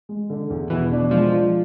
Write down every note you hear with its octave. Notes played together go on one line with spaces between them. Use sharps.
G#3
D3
E2
B2 E3
D4
F3 G#3
F4